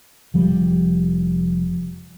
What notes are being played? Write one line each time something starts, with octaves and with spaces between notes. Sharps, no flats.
F1 F3 G3